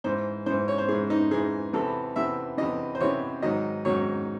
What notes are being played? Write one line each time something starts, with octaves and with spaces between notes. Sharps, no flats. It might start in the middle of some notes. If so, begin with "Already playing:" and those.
G#2 E3 C5
G#2 E3 C5
C#5
C5
G#2 E3 G#4
D#4
G#2 E3 G#4
E2 C3 E3 A4
E2 C3 E3 E5
E2 C3 E3 D#5
C5
E2 C3 E3 C#5
G#2 D#3 F#3 D#5
G#2 D#3 F#3 C#5